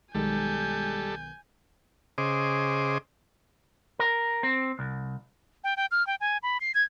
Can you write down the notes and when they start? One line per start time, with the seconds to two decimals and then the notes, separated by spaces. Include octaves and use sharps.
0.15 B1 D#3 G3 G#3 A4 G#5 G6
2.18 C#3 G#4 C5 D#5 D6
3.99 A#4
4.43 C4
4.79 C2
5.64 G5
5.77 G5
5.91 F6
6.07 G5
6.21 G#5
6.43 B5
6.61 C7
6.75 G#6